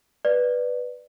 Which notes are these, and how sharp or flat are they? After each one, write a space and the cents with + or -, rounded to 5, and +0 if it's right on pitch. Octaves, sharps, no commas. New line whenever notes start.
B4 +0 D5 +15